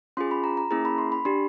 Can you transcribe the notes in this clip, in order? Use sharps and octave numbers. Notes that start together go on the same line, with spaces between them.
C#4 F4 G#4 C6
B5
A#5
A#5
A#3 C#4 E4 G#4 A#5
B5
C6
B5
D4 G4 C6